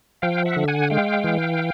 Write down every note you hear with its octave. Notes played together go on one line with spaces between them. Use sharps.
F3 F5 G5
E5 F#5
D3
F#5 G#5
G#3 F5 G5
E3